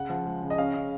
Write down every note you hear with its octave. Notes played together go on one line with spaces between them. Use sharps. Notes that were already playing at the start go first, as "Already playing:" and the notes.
Already playing: C#3 F#5
F3
G#3
C#3
D#5
C#4 F5
C#3